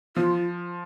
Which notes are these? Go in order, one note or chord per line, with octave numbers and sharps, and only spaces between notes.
F3 F4